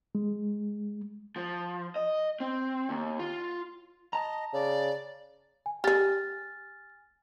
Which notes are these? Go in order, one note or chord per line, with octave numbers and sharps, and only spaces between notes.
G#3
F3
D#5
C4
D#2
F4
D#5 A5 A#5
C#3 D5
G#5
G4 G#4 G#5 F6 A6